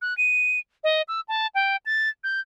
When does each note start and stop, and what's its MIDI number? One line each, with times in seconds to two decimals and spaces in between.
0.02 0.16 90
0.17 0.59 99
0.84 1.02 75
1.08 1.21 88
1.28 1.47 81
1.55 1.76 79
1.86 2.09 93
2.24 2.40 91